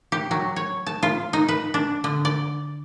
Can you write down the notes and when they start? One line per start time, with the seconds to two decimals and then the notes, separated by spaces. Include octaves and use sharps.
0.12 G4
0.31 F#3
0.56 C#5
0.87 A5
1.03 F4
1.33 D#4
1.48 B4
1.74 D4
2.04 D3
2.25 D5